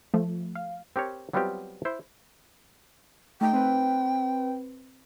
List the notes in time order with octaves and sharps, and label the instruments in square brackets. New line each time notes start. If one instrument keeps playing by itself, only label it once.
[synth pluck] F3 A3
F5
[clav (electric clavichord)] C4 G4 A#4 C#5
F#3 G3 B3 C4 F4 G4
E4 C5
[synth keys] A3 D#4 [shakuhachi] G5
[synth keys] C4 B4